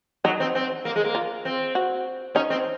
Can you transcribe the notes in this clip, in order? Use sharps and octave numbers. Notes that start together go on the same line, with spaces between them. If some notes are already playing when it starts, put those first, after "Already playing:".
F#3 D#4
C4
C4
A#3
G#3
A#3
F4
C4
F#4
C#4 D#4
C4